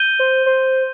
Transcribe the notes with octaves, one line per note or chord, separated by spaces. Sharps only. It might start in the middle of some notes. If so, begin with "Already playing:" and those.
Already playing: G6 D#7 G7
C5
C5